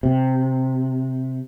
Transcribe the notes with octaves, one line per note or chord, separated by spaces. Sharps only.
C3